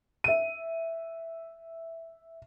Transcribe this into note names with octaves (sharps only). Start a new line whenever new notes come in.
E5 D#7